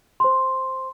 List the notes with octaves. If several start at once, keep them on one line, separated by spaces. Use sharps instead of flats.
C5 C6